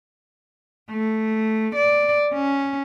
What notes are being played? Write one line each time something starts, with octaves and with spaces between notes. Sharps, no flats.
A3
D5
C#4